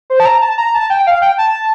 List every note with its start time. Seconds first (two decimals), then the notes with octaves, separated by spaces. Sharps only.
0.10 C5
0.20 A5
0.25 A#5
0.42 A5
0.58 A#5
0.74 A5
0.90 G5
1.07 F5
1.22 G5
1.38 A5